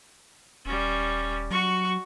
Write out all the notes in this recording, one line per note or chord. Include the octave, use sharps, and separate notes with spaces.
D#1 G3 C#4
F#3 F#4 C#6